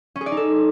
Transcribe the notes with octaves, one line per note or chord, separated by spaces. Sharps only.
C#4
G#4
D5
D#4
A4